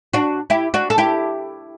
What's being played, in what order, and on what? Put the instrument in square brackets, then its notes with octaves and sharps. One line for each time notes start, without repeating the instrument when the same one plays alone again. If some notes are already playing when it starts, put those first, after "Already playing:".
[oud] D4 F#4
E4 G4
D4 F#4
A4
E4 G4